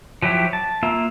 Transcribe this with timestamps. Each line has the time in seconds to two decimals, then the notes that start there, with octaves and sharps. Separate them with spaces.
0.22 F3 F#3 E4 G4
0.53 A5
0.83 A#3 F4 E5